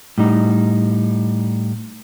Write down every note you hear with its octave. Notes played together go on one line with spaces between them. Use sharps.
A2 G3 D#4